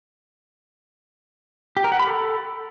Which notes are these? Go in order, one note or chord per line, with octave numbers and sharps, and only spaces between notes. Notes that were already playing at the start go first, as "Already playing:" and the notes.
G4
A#4
F#5
B5
A4